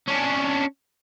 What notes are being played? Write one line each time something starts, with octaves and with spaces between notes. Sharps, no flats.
C#4 D4